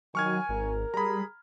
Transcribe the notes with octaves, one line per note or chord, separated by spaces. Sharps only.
D#3 F#3 G#5 C#6 F6 G#6
G#1 A#4
G3 G#4 A#5 B5